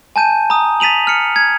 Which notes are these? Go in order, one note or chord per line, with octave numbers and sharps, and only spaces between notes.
G#5 A5 G6 D#7
A#5 D#6
A6 B6 D#7 F7 F#7
F6 C#7
G#6